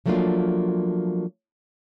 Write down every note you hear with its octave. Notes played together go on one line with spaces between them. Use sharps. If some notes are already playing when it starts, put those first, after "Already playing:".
F3 F#3 A3 A#3 D4 F4